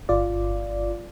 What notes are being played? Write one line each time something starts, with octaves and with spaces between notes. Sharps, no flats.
G1 F4 D5